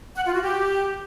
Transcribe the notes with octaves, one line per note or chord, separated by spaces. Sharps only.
F#5
F4
F#4
G4